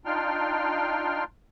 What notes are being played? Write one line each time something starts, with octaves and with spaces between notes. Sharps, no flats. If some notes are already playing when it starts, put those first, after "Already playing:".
D4 D#4 F4 G5 C6 F6